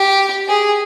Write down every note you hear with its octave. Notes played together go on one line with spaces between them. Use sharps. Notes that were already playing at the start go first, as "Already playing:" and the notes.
Already playing: G4
G#4